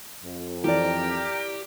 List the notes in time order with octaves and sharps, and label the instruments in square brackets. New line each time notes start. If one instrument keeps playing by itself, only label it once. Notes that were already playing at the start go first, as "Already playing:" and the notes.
[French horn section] F2
[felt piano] E3 D5 [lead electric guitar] G4 [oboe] A#4